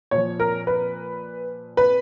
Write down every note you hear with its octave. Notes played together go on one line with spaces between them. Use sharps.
A#2 F3 C#5
A#4
B4
B4